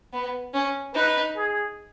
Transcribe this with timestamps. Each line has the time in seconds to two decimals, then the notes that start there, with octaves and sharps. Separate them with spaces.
0.13 B3
0.54 C#4
0.94 D#4 B4
1.35 G#4